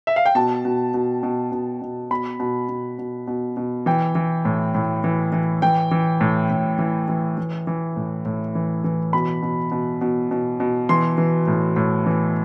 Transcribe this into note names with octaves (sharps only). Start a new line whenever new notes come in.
E5
F5
G5
B2 A5
B2
B2
B2
B2
B2
B2 B5
B2
B2
B2
B2
B2
E3 G5
E3
A2
A2
E3
E3
E3 G5
E3
A2
A2
E3
E3
E3
E3
A2
A2
E3
E3
B2 B5
B2
B2
B2
B2
B2
E3 C6
E3
A2
A2
E3